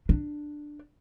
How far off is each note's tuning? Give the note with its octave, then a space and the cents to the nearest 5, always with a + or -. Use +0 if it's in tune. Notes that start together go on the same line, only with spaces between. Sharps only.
D4 +5